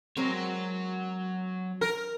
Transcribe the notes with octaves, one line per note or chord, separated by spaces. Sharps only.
F#3 G#3 C4 A#4 C#5
A#4